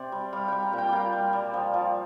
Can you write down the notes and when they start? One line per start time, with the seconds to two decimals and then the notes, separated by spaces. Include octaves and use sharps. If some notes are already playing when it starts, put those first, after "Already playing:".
Already playing: C3 C5 D5
0.12 G3
0.33 G3 F5
0.48 G3 G5
0.63 A#5
0.73 A#2
0.78 G5
0.89 A#2 D5 F5
1.13 G3
1.33 G3
1.54 F3
1.74 F3